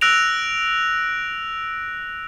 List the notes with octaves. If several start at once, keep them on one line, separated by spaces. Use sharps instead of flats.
E6 F#6 A#6 D7 F7